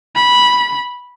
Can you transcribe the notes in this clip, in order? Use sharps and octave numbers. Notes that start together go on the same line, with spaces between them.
B5